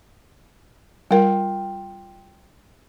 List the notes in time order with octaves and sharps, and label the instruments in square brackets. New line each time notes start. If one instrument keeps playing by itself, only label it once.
[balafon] G3 A#4 [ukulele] F4 G5